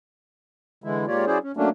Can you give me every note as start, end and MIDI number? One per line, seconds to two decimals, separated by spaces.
0.84 1.05 50
0.84 1.05 52
0.84 1.05 56
0.84 1.05 64
1.07 1.25 44
1.07 1.25 58
1.07 1.25 65
1.07 1.25 67
1.07 1.25 73
1.07 1.25 74
1.27 1.38 54
1.27 1.38 61
1.27 1.38 64
1.27 1.38 68
1.27 1.38 72
1.27 1.38 74
1.43 1.52 61
1.57 1.69 54
1.57 1.69 57
1.57 1.69 58
1.57 1.69 61
1.57 1.69 62